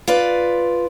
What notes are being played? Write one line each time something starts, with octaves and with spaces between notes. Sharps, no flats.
F4 B4 D5